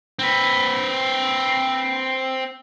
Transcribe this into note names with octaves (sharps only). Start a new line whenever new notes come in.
C4 B4